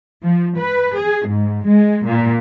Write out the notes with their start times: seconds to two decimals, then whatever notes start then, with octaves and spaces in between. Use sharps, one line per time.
0.24 F3
0.58 B4
0.95 G#4
1.29 G#2
1.66 G#3
2.07 A#2